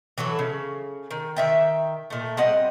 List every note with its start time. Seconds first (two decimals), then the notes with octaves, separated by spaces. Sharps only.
0.18 E3 F#3 F#4 A4
0.39 C#3
1.11 D#3
1.36 D#3 E5 G5
2.10 A#2 A3
2.37 G3 C4 D#5 F#5